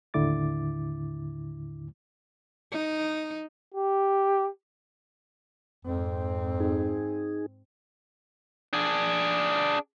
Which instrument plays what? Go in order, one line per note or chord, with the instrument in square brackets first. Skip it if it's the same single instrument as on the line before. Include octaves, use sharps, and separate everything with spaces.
[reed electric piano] D#2 A2 D3 E4 D6 A6
[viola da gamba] D#4
[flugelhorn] G4
[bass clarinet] F2 [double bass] G#2 C4
[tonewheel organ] D#4 G#4
[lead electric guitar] D4 G#4